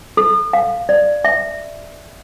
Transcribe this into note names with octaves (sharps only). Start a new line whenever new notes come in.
A4
F5
D5
E5